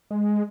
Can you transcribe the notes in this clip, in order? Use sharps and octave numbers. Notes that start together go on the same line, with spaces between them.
G#3